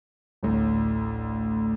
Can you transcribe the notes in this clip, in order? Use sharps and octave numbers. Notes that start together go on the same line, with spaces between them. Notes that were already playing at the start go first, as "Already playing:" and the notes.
A1 D2